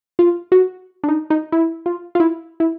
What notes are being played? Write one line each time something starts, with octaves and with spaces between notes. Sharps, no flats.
F4
F#4
D4
D#4
D#4
E4
F4
F4
E4
E4